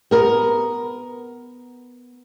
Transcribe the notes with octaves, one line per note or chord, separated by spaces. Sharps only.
B3 A#4